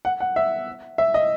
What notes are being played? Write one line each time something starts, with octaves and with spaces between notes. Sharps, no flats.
F#5
F#5
E5
E5
D#5